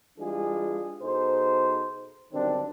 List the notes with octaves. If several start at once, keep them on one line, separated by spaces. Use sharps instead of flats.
E3 G3 G#3 D4 F4 G#4
B2 D#4 G#4 A4 C5
B1 G2 D3 D#3 C4 D4